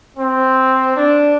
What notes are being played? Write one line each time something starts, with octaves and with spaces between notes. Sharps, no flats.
C4
D4